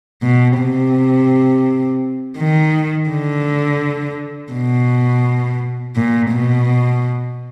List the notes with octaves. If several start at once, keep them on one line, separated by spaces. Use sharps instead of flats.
B2
C3
D#3
D3
B2
A#2
B2